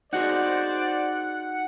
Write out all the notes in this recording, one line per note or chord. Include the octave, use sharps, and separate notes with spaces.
D#4 F#4 G#4 C5 D5 F#5